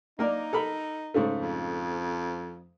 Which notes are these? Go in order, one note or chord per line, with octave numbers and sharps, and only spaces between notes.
A#3 D#4 A#4 D5
A4 A#4 B5
G#2 C#3 A3
F2